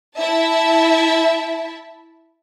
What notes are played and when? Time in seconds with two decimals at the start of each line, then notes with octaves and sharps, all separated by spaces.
0.18 E4 E5 A5